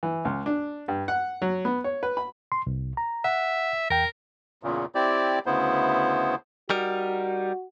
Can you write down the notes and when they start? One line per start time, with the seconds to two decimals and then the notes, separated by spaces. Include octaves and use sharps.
0.03 E3
0.25 C#2
0.46 D4
0.88 G2
1.08 F#5
1.42 F#3
1.65 B3
1.84 C#5
2.03 B4
2.17 B5
2.52 C6
2.67 C2
2.97 A#5
3.25 E5 F#5
3.90 E2 A#4 G5
4.63 E2 A#2 C#3
4.95 C4 E4 G4 D5
5.46 D2 C#3 B3 E4 C5
6.70 G3 D#4 F#4 A#4